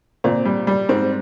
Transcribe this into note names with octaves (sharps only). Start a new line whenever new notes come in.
A#2 C4
G3
G3
G#2 C4